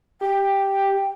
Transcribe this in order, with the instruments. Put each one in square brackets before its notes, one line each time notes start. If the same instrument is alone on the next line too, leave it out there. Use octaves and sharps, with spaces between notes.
[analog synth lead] G4 [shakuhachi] G5